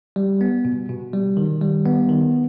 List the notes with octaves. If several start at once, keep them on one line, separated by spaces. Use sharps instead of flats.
G3
B3
B2
B2
G3
D#3
G3
B3
D#3